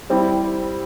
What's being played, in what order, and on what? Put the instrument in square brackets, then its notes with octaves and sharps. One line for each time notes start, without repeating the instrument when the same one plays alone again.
[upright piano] G3 C4 E4 G4